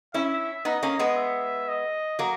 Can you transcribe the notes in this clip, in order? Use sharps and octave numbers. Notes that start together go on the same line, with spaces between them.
C#4 E4 E5
B3 D#4 D#5
A#3 C#4
G#3 B3
E5
D#5
F#3 A#3